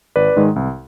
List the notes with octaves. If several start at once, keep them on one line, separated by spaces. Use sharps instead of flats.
G#1 B4 D5
G#2 D#3 G#3
C2